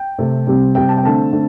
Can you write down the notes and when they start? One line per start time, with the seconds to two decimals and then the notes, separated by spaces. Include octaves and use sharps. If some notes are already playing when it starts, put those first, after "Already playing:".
Already playing: G5
0.18 C3 A3 C4
0.47 C3 G3 C4
0.75 C3 G3 C4 G5
0.89 A5
0.97 G5
1.03 D3 A3 C4 A5
1.33 D3 A3 C4